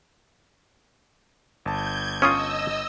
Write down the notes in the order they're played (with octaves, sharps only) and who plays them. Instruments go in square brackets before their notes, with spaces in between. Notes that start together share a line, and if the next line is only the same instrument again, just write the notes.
[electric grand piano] G1 A5 [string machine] G6 G#6
[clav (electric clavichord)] C#4 F4 [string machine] D#5 E6 [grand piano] C#6 D#6